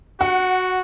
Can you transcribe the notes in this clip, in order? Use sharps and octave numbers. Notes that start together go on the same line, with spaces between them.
F#4 F#5